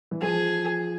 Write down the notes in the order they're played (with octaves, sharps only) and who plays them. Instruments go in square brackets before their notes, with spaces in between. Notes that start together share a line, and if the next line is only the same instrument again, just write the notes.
[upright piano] E3
[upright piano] F3 [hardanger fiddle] G#4